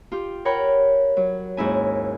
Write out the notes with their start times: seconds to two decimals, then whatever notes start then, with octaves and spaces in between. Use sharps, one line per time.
0.12 F4 G4
0.45 A#4 C#5 F#5 G5 B5
1.17 F#3
1.57 D#2 G#2 C#4 E4 G#5